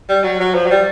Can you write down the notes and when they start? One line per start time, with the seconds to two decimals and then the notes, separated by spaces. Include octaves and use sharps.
0.09 G3
0.24 F#3
0.40 F#3
0.55 F3
0.66 F#3
0.71 G3